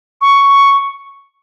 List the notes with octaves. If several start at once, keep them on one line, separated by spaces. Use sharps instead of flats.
C#6